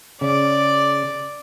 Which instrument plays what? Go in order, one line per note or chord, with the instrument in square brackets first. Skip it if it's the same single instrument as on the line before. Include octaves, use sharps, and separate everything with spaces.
[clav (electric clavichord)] C#3 [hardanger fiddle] D5